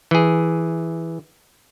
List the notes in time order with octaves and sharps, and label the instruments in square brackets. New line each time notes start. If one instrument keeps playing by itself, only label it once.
[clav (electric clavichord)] E3 G#4